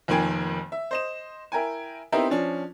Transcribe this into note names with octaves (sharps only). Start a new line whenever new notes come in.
F1 F2 D#3 A#3 G5 G#5
E5
C5 D#5 E7
E4 A#4 G5 G#5
B3 C4 D#4 E4 G4 A#4
F3 C#4 D4